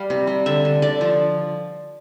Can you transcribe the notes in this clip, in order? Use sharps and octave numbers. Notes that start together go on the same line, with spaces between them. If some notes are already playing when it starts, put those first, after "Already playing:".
Already playing: G3 F5
C3
G3
D3 E5
D3
D3 D5
F3